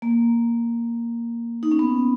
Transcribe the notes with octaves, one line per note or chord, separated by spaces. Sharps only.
A#3
D#4
C#4
B3